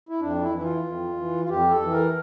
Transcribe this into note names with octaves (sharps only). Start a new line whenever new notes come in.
E4
F2 D4
E4
E3 E4
F4
F2
E3
F4
F2 G4
A4
E3
A#4